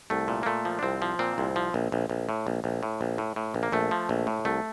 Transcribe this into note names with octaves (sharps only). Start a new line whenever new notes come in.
C2 A3
A#2
A#3
A#2 A3
F3
D4
C2 C4
F3
A#2 C4
C2
F3
A#1
A#1
A#1
A2
A#1
A#1
A2
A#1
A2
A2
A#1
A#3
A#1 A3
F3
A#1
A2
C2 A3